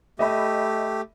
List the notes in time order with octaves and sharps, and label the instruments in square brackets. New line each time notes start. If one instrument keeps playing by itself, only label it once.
[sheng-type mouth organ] A3 G4 [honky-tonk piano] D#5 E5 B5